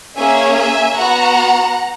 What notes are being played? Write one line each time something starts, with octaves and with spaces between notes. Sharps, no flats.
A#3 C#4 G#4 E5 G#5
E5 G#5
B3 F#4 F#5 A#5